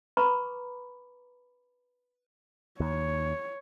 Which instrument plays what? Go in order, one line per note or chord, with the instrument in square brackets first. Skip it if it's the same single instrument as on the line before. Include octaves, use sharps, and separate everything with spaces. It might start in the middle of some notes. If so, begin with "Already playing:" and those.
[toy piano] B4 A#5 B5 C#6 D6
[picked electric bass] D#2 [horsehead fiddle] C#5